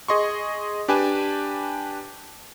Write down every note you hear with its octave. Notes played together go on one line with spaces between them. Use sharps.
G#4 D#5 C6 C#6
D4 G4 B4 G#5 A5